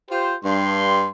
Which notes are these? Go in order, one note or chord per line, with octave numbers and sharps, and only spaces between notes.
F4 G4 C5
G2 C6